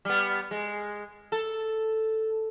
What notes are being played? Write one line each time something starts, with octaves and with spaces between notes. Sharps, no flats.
G3 B3
G#3
A4